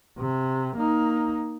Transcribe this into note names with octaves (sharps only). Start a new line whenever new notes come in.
C3
A#3 D#4